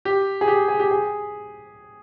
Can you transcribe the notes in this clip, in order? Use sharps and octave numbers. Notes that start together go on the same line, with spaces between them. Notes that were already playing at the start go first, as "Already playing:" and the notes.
G4
G#4
G4
G#4
G4
G#4